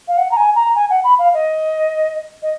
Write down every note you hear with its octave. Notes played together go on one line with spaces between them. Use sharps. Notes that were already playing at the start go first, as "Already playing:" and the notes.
F5
F#5
A#5
G#5
A#5
G#5
F#5
B5
F5
D#5
D#5